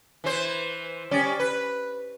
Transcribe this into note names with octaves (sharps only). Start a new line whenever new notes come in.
E3 C5
G3 C#4 D5
B4